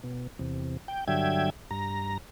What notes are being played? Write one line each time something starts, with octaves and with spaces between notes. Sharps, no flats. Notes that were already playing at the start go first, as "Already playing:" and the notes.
B2
E2 C3
G5
G2 D3 F#3 E5 G5 G#6
G2 A#5